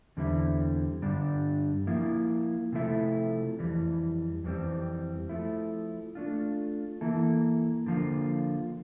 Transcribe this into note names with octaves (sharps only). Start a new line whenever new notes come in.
E2 D3 G3 C4 E4
G2 D3 G3 D4
F3 A#3 E4
C3 F3 A3 E4
F2 E3 G3
F2 E3 G3 C4
F3 A3 E4
A3 D4 F4
E3 A#3 E4 A4
D3 F3 A#3 F4